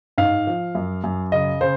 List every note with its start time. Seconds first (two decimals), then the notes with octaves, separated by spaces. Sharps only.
0.18 G#2 F5
0.47 F3
0.75 F#2
1.04 F#2
1.32 C#3 D#5
1.61 C#3 C5